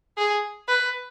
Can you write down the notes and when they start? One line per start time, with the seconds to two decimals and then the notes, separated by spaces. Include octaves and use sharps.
0.18 G#4
0.68 B4